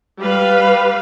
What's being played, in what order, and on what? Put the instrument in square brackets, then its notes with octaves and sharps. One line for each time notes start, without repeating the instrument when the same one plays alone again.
[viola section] G3 B4 F5